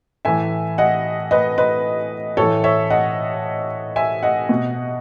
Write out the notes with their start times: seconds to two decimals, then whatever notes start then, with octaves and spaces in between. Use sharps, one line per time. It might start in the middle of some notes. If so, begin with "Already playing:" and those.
0.25 A2 E3 E5 G#5
0.78 D#5 F#5
1.31 B4 D#5
1.58 B4 D#5
2.37 A2 E3 A4 C#5
2.64 C#5 E5
2.90 D#5 F#5
3.96 E5 G#5
4.23 D#5 F#5
4.49 B2